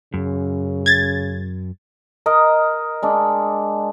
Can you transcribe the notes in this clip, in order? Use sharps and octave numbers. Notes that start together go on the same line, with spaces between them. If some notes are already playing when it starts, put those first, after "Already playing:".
F#2 C#3
G#6 A6
A#4 D#5
G#3 D4